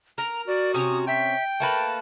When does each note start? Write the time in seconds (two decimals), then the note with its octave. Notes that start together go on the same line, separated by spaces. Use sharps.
0.18 A#4 A#5
0.48 F#4 D5
0.74 C3 C#4 C#5 D#6
1.07 E5 G5
1.60 A3 A#3 B4 A5